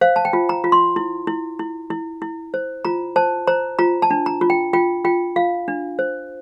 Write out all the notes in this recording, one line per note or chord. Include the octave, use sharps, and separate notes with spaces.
C5 F5
A5
G5
F4
A#5
F4
C6
E4
E4
E4
E4
E4
C5
F4 A#5
C5 A5
C5 A#5
F4 A#5
A5
D4
A#5
F4
G5
F4 G5
F4 G5
F4 F5
D4
C5